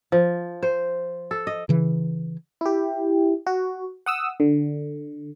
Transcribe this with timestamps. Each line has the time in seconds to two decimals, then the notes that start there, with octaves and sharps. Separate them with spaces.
0.12 F3
0.63 C5
1.31 A4
1.47 D#5
1.69 C#3 E3
2.61 E4 G4
3.47 F#4
4.06 F#5 D#6 E6
4.40 D3